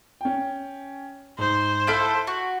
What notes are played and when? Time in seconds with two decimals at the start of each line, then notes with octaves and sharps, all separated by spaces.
0.21 C#4 G5
1.38 G#2 C5
1.87 E4 A4 F5 B6 D7
2.27 F#4